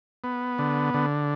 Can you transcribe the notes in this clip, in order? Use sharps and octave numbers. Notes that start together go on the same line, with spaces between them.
B3
D3
D3